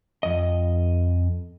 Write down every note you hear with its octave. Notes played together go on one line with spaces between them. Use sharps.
F2 D#5